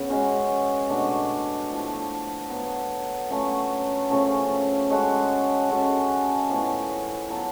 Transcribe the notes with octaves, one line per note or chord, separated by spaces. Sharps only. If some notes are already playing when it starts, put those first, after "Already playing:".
Already playing: C#3 B3
G#3 C#4 F#4
B2 A3 D4 F#4
A2 F3 A3
F#3 B3 F4
F#3 A3 C#4 F4
C#3 F3 A3 C#4
G#3 C#4 F#4 A4
G#3 C#4 F#4 A4
A2 F3 B3 F4
F#3 B3 F4 A4